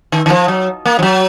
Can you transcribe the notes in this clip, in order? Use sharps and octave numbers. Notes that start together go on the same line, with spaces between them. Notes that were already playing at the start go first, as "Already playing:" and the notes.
D#3
D#3
F3
F#3
A#3
F3
F#3